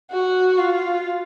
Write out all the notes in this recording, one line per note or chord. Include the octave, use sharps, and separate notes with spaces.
F#4
F4